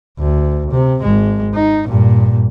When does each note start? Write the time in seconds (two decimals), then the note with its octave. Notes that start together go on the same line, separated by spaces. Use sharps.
0.19 D2
0.72 C3
1.02 G#1 G#3
1.54 D#4
1.88 G2 A#2